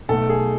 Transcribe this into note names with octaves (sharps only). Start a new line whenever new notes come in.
B1 B2 A3 A4
G#4